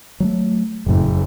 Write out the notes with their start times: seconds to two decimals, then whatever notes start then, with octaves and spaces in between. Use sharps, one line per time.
0.20 F#3 G3 A3
0.86 F#1 F2 A2